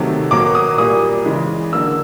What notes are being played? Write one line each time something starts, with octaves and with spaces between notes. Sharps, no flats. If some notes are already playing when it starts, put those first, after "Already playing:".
Already playing: C3 D#3 F#3 A3
B2 F#3 A#3 D6
D#6
A#2 G3 A#3 D#6
C#3 E3 G#3
D3 F#3 A#3 E6